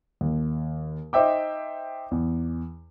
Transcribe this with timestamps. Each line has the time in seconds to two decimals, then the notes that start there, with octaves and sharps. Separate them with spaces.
0.21 D#2
1.13 D#4 C5 E5 G5 D6
2.11 E2